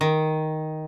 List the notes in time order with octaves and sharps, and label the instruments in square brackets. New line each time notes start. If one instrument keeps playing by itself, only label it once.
[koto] D#3